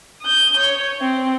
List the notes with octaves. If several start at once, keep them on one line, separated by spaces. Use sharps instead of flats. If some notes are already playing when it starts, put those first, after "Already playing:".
D#6 G6
C#5
C4